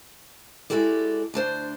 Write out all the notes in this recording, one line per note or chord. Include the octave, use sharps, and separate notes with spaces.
G#3 E4 F#4 G4 A4 D5
D2 D4 C5 A5